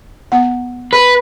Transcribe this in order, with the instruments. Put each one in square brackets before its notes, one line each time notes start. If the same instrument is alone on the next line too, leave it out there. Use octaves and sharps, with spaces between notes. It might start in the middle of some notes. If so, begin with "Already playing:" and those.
[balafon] B3 F#5
[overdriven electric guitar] B4